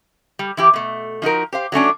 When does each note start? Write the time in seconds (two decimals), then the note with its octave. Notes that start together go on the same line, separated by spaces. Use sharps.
0.39 G3
0.57 E3 E4 G4
0.73 B2 A3
1.22 F3 D#4 F#4 A#4
1.53 G4 C5 F5
1.72 F#3 A3 C#4 D4